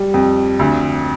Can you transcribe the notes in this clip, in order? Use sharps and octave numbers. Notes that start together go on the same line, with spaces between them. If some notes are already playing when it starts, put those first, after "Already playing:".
Already playing: G3
F2
D2